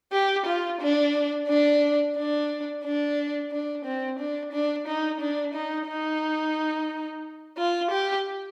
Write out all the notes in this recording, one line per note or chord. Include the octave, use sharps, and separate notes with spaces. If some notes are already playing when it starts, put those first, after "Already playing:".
G4
F4
D4
D4
D4
D4
D4
C4
D4
D4
D#4
D4
D#4
D#4
F4
G4